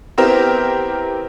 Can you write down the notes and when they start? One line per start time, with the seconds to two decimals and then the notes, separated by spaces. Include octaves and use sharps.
0.18 B3 C4 E4 G4 A#4